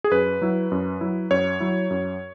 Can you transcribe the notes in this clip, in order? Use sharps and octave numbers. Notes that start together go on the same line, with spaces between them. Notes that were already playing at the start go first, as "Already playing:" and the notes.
G#4
F#2 B4
F#3 E4
F#2
F#3 E4
F#2 C#5
F#3 E4
F#2